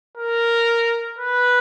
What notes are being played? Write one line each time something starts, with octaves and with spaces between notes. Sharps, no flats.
A#4
B4